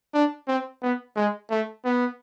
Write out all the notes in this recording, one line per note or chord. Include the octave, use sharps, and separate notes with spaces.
D4
C4
B3
G#3
A3
B3